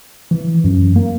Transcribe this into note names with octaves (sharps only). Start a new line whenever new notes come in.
E3
F#2
A#3